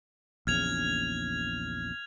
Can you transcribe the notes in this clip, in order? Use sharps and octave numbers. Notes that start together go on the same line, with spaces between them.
A#1 E2 C#3 F6 G#6 F7